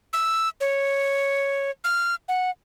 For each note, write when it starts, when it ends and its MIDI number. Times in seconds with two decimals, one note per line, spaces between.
0.13 0.49 88
0.60 1.70 73
1.84 2.15 89
2.28 2.50 78